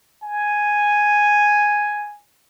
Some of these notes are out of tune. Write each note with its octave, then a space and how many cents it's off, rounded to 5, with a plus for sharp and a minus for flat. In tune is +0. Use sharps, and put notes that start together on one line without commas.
G#5 +0